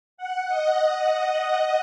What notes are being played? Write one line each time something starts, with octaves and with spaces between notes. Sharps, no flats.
F#5
D#5